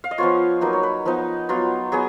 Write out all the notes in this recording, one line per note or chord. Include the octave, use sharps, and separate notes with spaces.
F5
D#5
F3 B3 F4 C#5
F#3 A#3 D#4 B4
C#5
B4
F3 B3 D#4
F#3 B3 F4
F#3 B3 G#4